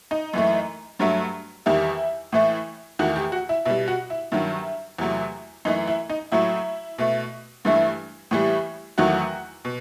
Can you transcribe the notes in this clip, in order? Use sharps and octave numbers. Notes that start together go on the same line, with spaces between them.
D#4
F#2 E3 A3
G2 F#3 A3
E2 D#3 G3 E4
A2 E3 A3
E2 D#3 A3 F#4
G4
F#4
E4
B2 G3 E4
F#4
E4
G2 D#3 F#3 E4
E2 C3 F#3 A3
F#2 E3 A3 D#4
E4
D#4
A2 F#3 A3 E4
B2 A3
G2 E3 A3
A2 E3 G3
E2 D#3 F#3 A3 F#4
B2